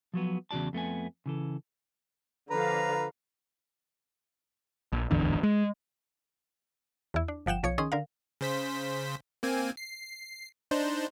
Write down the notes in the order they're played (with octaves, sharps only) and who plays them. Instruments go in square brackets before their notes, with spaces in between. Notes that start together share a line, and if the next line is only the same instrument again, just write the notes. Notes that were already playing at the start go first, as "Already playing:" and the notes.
[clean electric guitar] F3 F#3 B3
E2 C#3 E3 F#4 D5 A5
F2 A3 B3 G#5
C#3 E3 A4
[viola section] D3 F3 F5 [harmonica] B4 A#5
[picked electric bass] A#1
D1 G#1 E2 D3
G#3
[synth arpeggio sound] E2 E4
D4
G1 F3 F#5 G5 E7
B1 F3 C#5 G#6 C#7
D#3 C#4 G#4 C6 D#6
D3 A#4 F5
[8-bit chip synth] C#3 C5 B6
A#3 C4 G#5
C7
D4 D#4 C5